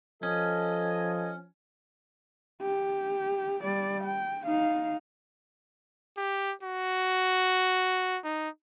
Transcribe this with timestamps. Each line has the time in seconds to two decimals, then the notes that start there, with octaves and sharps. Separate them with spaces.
0.23 F3 C#4 A4 D#5
2.62 G4
3.63 G3 D5
4.04 G5
4.46 D#4 F5
6.18 G4
6.63 F#4
8.24 D#4